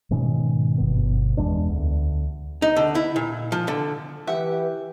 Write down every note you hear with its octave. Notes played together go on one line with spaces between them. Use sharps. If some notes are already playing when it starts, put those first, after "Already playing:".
G#2 B2 D#3 C#4
G1 G2 B2 B3
E2 G#3 B3 D4
D2
D#4
D3
E4
A#2
F3
D3
E3 G4 B4 E5 F#5